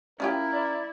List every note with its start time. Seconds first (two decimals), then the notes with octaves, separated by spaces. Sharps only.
0.20 C#4 E4 F4 G4 A#4
0.53 D5